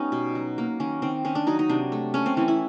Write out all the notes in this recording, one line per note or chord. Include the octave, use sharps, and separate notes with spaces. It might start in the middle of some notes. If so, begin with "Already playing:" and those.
Already playing: G3 B3 C#4 D#4
B2
F#3
A#3
D#3 C#4
D#3 C4
D#3 C#4
D4
F#3 D#4
D#4
C3 D4
A3
A3 C#4
C4
E3 C#4
E4